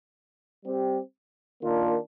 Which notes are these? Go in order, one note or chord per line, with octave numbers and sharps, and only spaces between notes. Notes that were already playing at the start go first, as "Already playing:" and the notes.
G3 C4 G4
D#3 A#3 D4 F4 A#4